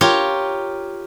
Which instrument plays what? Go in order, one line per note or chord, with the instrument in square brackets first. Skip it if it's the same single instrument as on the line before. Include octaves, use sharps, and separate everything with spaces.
[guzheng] F4 G4 A#4 C#5